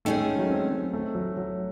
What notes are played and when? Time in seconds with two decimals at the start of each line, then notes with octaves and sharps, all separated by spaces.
0.05 D#3 G#3 A3 C#4 G#4
0.17 A3
0.39 F#3
0.50 C4
0.93 A3
1.15 F#3
1.37 F#3